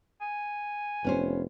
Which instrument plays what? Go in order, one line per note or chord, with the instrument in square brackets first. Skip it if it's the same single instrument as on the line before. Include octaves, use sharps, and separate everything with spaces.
[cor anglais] G#5
[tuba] F1 [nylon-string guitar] B3 C#4 C5